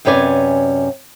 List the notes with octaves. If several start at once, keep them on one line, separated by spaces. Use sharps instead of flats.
F#2 C3 C#4 B4 D5 G#5